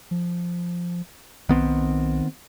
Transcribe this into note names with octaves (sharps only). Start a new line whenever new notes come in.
F3
B1 D#3 B3 C4